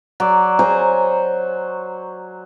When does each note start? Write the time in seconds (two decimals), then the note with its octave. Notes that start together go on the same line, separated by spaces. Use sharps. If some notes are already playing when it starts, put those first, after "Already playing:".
0.20 F#3 D5
0.59 C5 C#5 G#5 A#5